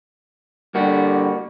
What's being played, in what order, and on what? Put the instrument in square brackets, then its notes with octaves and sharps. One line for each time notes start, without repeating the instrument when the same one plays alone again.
[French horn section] D3 G3 [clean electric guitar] A#3 F#4